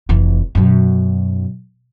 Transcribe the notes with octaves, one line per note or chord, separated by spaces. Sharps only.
F1 E3
F#2 B2